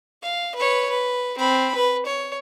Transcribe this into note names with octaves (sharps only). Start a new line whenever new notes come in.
F5
B4 C#5
B4
C4 B5
B4
C#5